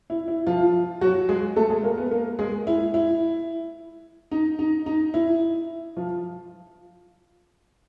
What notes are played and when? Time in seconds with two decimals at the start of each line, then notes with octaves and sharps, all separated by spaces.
0.10 E4
0.28 E4
0.47 F3 F4
1.01 F#3 F#4
1.29 G#3 G#4
1.56 A3 A4
1.70 G#3 G#4
1.84 A#3 A#4
1.98 B3 B4
2.11 A#3 A#4
2.39 G#3 G#4
2.67 E4
2.94 E4
4.31 D#4
4.59 D#4
4.86 D#4
5.14 E4
5.97 F3 F4